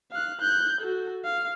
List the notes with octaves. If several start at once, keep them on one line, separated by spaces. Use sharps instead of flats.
F5 F#6
F#6 G6
F#4 A4
F5